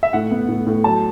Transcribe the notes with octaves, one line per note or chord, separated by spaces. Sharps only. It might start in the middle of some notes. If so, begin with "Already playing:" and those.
E5
A2 F#5
B3
A2
A2
F#3 A5